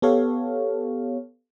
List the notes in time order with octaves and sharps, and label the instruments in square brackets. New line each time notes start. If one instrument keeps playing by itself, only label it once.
[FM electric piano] B3 G4 A4 C#5 F5